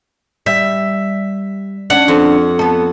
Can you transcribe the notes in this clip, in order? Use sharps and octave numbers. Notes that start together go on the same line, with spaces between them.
G3 E5
C#4 D4 F#5
F2
B3 A4